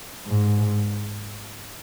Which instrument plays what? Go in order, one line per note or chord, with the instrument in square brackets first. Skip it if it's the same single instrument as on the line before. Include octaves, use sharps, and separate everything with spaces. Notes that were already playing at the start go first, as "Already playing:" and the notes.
[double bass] G#2